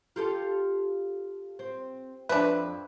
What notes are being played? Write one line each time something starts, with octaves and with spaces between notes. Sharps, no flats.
F4 G4 A4
C4
F2 D4 B4 E5